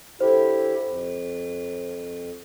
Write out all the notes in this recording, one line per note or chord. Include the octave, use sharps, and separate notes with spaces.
D3 E4 G4 C5
F2